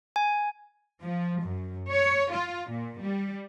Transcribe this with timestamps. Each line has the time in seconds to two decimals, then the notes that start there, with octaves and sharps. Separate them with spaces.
0.16 G#5
1.02 F3
1.42 F#2
1.91 C#5
2.32 F4
2.70 A#2
3.01 G3